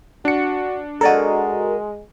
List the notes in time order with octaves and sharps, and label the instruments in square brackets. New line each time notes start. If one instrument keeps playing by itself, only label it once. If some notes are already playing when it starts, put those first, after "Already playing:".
[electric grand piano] D4 C#7 [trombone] F#4
[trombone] G#3 [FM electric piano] F#4 A#4 [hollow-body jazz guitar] A4 D5 D#5